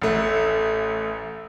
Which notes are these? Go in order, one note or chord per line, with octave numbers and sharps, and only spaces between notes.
A1 A3